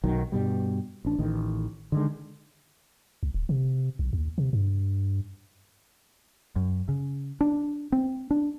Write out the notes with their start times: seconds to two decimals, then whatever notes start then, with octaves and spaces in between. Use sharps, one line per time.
0.04 B1 D#3 F#3
0.32 G2 B2 G3
1.05 A1 D4
1.19 A1 A2 D#3
1.92 D3 D#3 G#3
3.23 C2
3.34 D1
3.49 C3
3.99 B1
4.13 D#2
4.38 C3
4.53 G2
6.56 F#2
6.89 C#3
7.41 D4
7.92 C4
8.31 D4